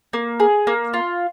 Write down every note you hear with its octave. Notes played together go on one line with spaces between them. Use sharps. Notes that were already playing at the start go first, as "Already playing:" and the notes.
A#3
G#4
A#3
F4